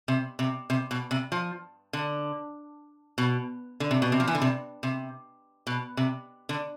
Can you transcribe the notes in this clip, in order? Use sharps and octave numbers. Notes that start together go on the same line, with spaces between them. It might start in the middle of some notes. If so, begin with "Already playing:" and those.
C3
C3
C3
B2
C3
F3
D3
B2
D3
C3
B2
C3
F3
E3
D3
C3
C3
B2
C3
D3